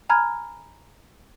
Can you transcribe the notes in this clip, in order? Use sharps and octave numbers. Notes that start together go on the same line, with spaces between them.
G#5 A#5 B5 F6 G#6